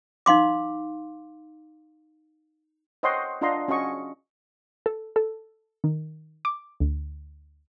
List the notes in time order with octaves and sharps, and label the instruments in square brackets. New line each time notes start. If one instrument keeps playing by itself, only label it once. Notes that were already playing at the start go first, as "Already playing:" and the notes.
[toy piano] D#4 F5 C6 D6
[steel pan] C5 C#5 D#5 F#5 G5 C6
D4 F4 D#5 F#5 A#5 C6
C#4 F#4 D#5 C#6
[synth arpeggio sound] A4
A4
D#3
D6
D2